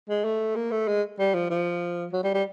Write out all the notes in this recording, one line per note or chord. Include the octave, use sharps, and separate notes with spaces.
G#3
A3
A#3
A3
G#3
G3
F3
F3
F#3
G3
G3